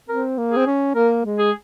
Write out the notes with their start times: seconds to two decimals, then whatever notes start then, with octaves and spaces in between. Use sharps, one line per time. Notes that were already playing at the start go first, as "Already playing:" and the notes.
0.09 C4 A#4
0.38 A#3
0.52 C4 G#4
0.66 C#4
0.95 A#3 A#4
1.25 G#3
1.38 G#4